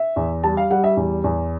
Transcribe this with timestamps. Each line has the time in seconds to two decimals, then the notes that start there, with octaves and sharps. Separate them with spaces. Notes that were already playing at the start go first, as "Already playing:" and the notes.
Already playing: E5
0.16 E2
0.43 G3 A5
0.57 F5
0.70 G3 F#5
0.84 E5
0.97 E2
1.24 E2